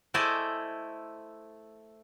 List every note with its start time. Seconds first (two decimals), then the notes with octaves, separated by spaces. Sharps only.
0.14 A3 E4 C5 D5 D#5 G#5